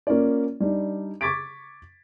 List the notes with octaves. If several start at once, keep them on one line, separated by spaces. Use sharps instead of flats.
A#3 C#4 F4 D5
G3 D4 D#4
C#6 D6 G#6 A6 B6 D7